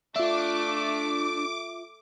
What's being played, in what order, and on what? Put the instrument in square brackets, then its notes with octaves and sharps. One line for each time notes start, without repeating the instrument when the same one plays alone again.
[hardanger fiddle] A3 [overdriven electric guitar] D4 [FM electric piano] F4 E5 [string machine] D6